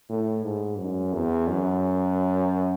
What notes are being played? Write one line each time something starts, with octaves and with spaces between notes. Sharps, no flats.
A2
G#2
F#2
E2
F#2